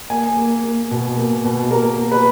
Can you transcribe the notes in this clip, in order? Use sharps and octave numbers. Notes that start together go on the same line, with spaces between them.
A#3 G#5
A#3
A#3
B2
A#3
B2
A#3 A#4
A#3
B4